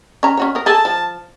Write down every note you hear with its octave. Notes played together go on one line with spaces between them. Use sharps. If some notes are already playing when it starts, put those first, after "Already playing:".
C#4 A#5
C#4 F#4 C#5
B3 A#4
G#4 A4 A5
F3